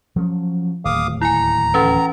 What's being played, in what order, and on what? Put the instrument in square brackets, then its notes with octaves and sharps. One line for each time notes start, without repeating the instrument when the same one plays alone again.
[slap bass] F3 F#3 C#4
[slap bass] D1 D#2 [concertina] F5 D6 D#6
[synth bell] E4 G#5 [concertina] A#5
[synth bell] E3 C#4 B4